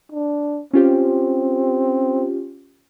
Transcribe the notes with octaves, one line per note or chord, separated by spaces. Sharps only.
D4
C4 C#4 F4 G4